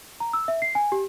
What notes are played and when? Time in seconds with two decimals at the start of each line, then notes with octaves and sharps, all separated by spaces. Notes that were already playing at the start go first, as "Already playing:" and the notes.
0.20 A#5
0.33 E6
0.48 E5
0.62 C7
0.75 G#5
0.92 G4